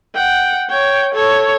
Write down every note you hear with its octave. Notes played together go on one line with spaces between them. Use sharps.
F#5 G5
C#5 G5
A4 C#5